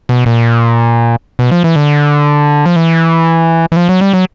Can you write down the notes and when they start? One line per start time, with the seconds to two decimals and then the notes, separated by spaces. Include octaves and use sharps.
0.09 B2
0.26 A#2
1.39 B2
1.51 F3
1.64 E3
1.76 D3
2.66 F3
2.76 E3
3.72 E3
3.76 F3
3.89 F#3
4.01 G3
4.13 F#3